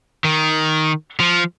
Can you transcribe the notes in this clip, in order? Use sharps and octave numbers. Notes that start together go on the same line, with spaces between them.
D#3
F3